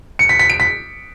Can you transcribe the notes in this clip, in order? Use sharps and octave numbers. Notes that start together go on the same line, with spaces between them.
C#7
B6
B6
D7
B6